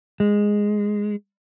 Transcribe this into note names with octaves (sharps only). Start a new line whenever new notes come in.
G#3